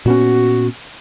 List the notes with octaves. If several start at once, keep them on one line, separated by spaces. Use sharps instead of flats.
A#2 B3 C#4 F#4